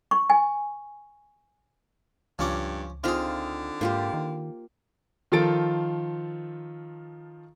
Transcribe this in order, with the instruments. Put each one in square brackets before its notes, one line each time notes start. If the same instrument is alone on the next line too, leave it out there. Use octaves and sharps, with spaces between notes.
[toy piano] C#6
G#5
[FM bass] C#2 [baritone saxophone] G2 [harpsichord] F3 C#4 D6
[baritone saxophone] D3 [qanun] C4 D#4 F4 [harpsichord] G#4 F5
[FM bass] G#2 [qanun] A#3 F4 G4
[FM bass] D#3
[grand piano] D#3 F3 F4 A4 A6 D7